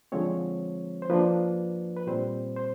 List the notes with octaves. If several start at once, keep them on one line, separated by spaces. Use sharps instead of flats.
D3 F3 G#3 C4 C#5
C5
F3 A#3 D4 B4
B4
A#2 G3 C4 C5
C5